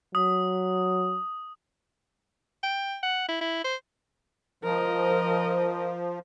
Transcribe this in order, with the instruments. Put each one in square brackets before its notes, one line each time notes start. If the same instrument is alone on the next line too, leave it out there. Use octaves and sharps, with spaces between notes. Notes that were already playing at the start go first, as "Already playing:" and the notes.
[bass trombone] F#3 [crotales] D#6
[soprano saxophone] G5
F#5
E4
E4
C5
[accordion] F3 [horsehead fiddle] A#4 D#5